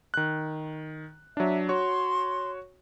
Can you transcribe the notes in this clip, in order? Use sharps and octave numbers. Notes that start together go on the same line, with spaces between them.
D#3 F#6
F#3 D4 E5
F#4 C#5 C6 C#6